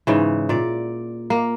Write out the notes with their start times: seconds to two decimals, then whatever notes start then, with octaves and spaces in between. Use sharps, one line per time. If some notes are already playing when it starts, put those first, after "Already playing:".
0.07 G#2 C#3 E3
0.49 A#2 D5
1.30 A#3